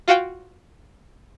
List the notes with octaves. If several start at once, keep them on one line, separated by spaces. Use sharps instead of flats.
F4 F#4 F5 G5